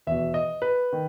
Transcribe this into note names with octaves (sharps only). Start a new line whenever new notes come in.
E2 B2 E5
D#5
B4
D#3